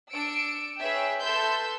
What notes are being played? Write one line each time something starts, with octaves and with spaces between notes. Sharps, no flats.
D4 E6 C#7 D7
G#4 B4 C#5 E5 G5
A4 B4 E5 C6 E6 G6